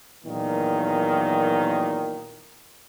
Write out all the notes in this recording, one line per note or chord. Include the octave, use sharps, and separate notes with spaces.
E2 A#2 D#3 F#3